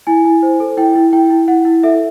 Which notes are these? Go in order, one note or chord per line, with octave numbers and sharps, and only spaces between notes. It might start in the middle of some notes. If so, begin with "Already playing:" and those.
E4 G#5
E4
C5
A4
E4 G5
E4
E4 G5
E4
E4 F#5
E4
A4 E5